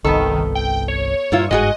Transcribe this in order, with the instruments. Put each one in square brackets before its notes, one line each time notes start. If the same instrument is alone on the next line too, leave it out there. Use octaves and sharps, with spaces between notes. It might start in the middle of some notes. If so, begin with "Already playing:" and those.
[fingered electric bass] G1 C2 [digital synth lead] D#3 [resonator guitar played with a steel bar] B3 A4
[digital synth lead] G5
C#5
[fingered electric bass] G2 [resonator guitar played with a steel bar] A#2 E4 F4
[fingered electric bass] G1 G#2 [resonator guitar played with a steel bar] G#3 F#4 G#4 [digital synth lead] D#5